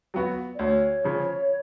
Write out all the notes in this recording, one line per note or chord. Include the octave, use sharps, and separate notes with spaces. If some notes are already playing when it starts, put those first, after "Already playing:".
F#3 B3 F#4
D5
D2 C#5
C#3 F3